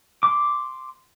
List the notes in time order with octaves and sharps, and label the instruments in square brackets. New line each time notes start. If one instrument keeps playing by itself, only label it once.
[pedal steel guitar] C6 D6